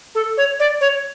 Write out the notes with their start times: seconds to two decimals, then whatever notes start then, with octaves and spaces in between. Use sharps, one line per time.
0.15 A4
0.37 C#5
0.60 D5
0.81 C#5